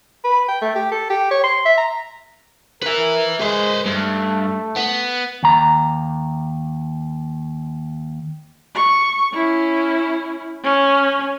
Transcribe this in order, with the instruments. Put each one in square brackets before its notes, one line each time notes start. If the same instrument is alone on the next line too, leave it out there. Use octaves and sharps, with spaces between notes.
[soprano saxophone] B4
G5
A3
G4
A4
G4
C#5
C6
E5
A#5
[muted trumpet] A#4 [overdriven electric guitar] B4 E5
[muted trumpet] G#3 [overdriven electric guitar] B4 C5
[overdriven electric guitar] G2 [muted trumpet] A3
[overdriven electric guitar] B3
[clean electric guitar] D#2 A#5
[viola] C#6
C#4 E4
C#4